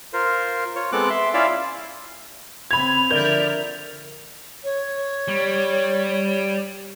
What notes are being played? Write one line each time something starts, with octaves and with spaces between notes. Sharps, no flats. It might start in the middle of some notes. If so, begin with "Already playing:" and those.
F4 A#4 C5
F4 C#5 C#6
G#3 B3 C4 A4 D6 F#6
E5 C6
C#4 E4 F4 D5 E5 F5
C#3 C4 B5 G#6 F7
D3 F3 A#4 D5 E5 G6
C#5
G3